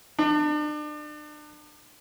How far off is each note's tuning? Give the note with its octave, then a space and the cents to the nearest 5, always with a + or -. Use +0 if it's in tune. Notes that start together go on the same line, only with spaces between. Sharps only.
D4 +35